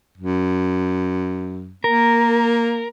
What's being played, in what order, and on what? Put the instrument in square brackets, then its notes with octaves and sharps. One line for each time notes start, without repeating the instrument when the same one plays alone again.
[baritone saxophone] F#2
[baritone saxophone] A#3 [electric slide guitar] A#4